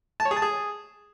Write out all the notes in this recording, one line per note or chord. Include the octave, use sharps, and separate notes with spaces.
A5
C#5
G#4
A5
G#4